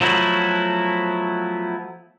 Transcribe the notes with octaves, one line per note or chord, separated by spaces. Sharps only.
F3 F#3 A3 B3 E4 F#4